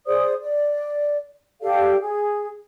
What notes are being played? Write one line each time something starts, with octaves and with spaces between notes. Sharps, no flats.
G#4 C5 D5 D#6
D5
G4 A4 D5 F5
G#4